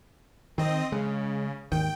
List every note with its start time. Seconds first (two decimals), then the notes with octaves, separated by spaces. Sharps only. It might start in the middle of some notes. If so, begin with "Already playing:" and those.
0.58 D#3 C4 D#5
0.92 C#3 G#3
1.72 G#1 D#2 D#3 G5